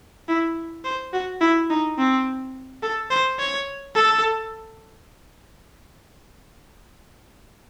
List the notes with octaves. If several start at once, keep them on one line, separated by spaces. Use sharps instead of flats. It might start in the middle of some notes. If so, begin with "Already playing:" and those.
E4
C5
F#4
E4
D#4
C4
A4
C5
C#5
A4